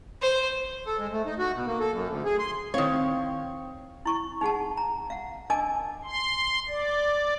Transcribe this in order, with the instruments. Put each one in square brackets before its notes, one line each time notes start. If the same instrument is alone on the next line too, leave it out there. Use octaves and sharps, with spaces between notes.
[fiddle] C5
[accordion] A4
G#3
A3
D#4
F#4
B2
A#3
A4
F#2
D2
G#4
C6
[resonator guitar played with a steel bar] D#3 C#5 [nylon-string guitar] C4 [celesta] E4 F5
[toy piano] E4 C#6
D#4 G#4 F#5 A5
A#5
F5 F#5
D4 A#4 D#5 G#5 A5 D6
[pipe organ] C6
D5